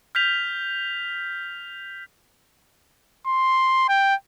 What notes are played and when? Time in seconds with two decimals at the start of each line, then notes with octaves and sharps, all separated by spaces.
0.15 F6 G6 B6 F7
3.27 C6
3.89 G5